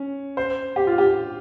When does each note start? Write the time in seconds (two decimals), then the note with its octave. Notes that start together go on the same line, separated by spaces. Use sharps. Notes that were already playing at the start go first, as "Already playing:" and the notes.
Already playing: C#4
0.37 C5
0.76 G4
0.87 F4
0.98 G4